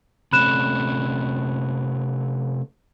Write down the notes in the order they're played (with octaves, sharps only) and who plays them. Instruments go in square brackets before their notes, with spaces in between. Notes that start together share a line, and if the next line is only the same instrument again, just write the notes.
[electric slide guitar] C3 A3 C#4 [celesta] B5 F#6 E7